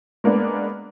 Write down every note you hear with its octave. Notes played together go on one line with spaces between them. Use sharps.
G#3 A#3 B3 D4